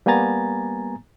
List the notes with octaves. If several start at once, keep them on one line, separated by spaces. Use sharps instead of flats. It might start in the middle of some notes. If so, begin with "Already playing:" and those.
G3 A#3 B3 G#5 A#5 A6